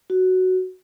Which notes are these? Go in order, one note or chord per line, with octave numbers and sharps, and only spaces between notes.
F#4